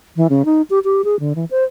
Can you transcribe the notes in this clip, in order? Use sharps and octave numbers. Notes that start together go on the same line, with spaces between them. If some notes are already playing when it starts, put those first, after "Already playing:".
E3
C#3
D#4
G4
G4
G#4
D3
E3
C5